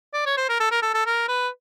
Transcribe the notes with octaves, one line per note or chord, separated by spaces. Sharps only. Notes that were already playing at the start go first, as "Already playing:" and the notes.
D5
C#5
C5
A#4
A4
A#4
A4
A4
A#4
B4